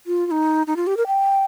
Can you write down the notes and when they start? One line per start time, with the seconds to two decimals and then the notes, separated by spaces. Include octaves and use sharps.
0.06 F4
0.26 F4
0.31 D#4
0.67 D#4
0.76 F4
0.87 G4
0.97 A#4
1.07 G5